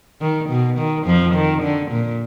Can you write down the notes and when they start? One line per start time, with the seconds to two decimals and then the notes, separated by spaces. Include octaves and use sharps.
0.21 D#3
0.49 B2
0.78 D#3
1.06 F2 F3
1.34 D#3
1.62 D3
1.91 A#2